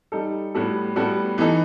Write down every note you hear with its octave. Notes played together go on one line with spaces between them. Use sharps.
G3 D#4 A4
A2 G3 B3 F#4 A4
A2 G3 B3 F#4 A4
E3 B3 D#4 A4